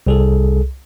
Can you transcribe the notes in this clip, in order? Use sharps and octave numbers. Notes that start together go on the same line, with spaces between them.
C2 G#4 A4